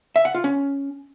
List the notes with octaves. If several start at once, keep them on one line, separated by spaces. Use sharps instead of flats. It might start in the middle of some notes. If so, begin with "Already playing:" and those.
E5
F#5
F4
C#4